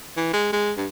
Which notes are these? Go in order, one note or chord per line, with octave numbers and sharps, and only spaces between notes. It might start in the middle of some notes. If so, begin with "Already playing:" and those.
E3
G#3
G#3
G2